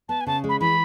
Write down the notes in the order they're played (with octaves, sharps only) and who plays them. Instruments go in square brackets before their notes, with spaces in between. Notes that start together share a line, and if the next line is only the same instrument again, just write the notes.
[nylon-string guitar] B3 [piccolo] A5
[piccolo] G#5
[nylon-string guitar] C#3 [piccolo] A5
[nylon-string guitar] G#3
[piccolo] B5
[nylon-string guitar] E3 [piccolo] B5